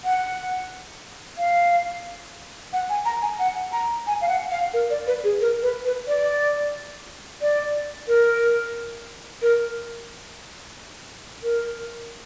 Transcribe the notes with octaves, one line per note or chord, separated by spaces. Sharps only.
F#5
F5
F#5
G#5
A#5
G#5
F#5
A#5
G#5
F5
F#5
F5
A#4
D5
B4
G#4
A#4
B4
B4
D5
D5
A#4
A#4
A#4